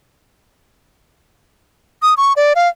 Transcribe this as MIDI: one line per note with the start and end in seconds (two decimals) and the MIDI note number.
2.02 2.14 87
2.17 2.33 85
2.37 2.53 74
2.56 2.68 77